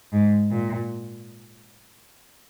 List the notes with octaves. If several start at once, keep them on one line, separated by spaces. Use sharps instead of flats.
G#2
A#2